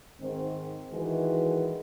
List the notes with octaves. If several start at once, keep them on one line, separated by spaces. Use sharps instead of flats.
G#2 D#3 C4
D2 D#3 E3 G#3 F#4 B4